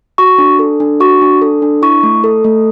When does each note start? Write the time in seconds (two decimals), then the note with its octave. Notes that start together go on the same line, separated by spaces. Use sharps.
0.18 F#4 C#6
0.38 D4
0.59 A4
0.80 D4
1.00 F#4 C#6
1.22 D4
1.42 A4
1.62 D4
1.82 E4 C#6
2.03 A3
2.24 A4
2.44 A3